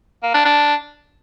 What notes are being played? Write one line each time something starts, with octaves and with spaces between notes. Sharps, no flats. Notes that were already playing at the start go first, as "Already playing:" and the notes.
A#3
D4
D4